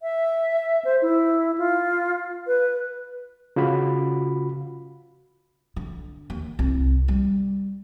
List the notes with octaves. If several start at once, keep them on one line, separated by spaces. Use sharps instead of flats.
E5
C5
E4
F4
B4
C#3 F4 F#4 B5
D3
D#2
C2
G3